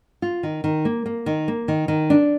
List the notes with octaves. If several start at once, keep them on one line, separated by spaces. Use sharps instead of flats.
F4
D#3
D#3
A#3
A#3
D#3
A#3
D#3
D#3
D4